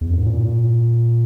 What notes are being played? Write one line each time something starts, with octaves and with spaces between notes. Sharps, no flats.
E2
F#2
G#2
A#2